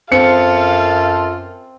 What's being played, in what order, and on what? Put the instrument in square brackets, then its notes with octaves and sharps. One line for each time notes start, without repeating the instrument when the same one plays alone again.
[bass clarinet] F#2 [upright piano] C4 C#7 [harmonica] F4 A4 [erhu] F5